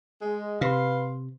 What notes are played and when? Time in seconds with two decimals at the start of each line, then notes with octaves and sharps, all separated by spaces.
0.21 G#3
0.61 C3 B4 F5 C6